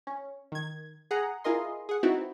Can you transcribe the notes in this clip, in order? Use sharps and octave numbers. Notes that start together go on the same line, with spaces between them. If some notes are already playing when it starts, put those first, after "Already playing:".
C#4
D#3 G#6
G#4 F#5 A#5
E4 F4 G#4 A#4 D#5 C6
G#4 F#5
B3 C4 D#4 E4 F#4